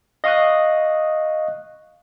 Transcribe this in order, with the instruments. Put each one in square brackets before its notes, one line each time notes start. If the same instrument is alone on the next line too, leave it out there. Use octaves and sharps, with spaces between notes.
[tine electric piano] D#5 F5 C#6 D#6 F#6